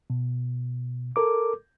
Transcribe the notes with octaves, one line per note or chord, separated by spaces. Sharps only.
B2
A4 A#4 D6